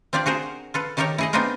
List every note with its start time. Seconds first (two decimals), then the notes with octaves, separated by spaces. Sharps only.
0.13 C4 D4 F4 G4 D5
0.26 F#4 G#4 A#4 C5
0.74 F4 A4 B4
0.97 D#3 D#4 G4 A4 A#4 C#5
1.18 E4 G#4 D#5
1.33 B3 C4 D4 D#4 F4 A#4